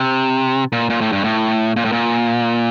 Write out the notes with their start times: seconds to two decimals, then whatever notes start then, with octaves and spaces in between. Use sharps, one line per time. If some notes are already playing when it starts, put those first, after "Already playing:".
Already playing: C3
0.72 A#2
0.90 A#2
1.01 A2
1.12 G2
1.24 A2
1.76 A#2
1.85 A2
1.92 A#2